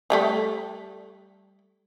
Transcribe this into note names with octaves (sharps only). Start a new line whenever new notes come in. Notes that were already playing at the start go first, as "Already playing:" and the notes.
F3 G3 A3